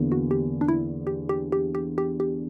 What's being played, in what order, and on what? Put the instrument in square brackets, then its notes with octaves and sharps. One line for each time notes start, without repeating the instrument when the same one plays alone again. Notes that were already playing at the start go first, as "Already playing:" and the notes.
Already playing: [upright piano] E2 D3 A#3
[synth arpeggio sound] F#4
G4
D4
E4
G4
G4
G4
G4
G4
G4